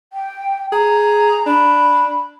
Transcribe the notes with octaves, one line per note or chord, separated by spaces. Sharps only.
G5
G#4 A#5
D4 B5